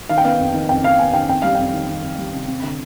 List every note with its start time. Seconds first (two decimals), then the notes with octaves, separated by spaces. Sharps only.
0.09 D#3 F5
0.18 G5
0.24 B3 F5
0.39 F2
0.54 D#3
0.69 F2 G5
0.83 F2 F5
0.99 B3 G#5
1.14 D#3 G5
1.29 F2 G5
1.42 G3 F5
1.55 F2 G5
1.73 D#3
1.89 D#3
2.03 F2
2.18 G3
2.33 C3
2.48 C4
2.63 D3